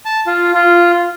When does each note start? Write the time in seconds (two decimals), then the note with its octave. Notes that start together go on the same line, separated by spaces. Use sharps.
0.05 A5
0.27 F4
0.54 F4